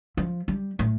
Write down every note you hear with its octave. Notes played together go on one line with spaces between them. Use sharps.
F3
G3
A2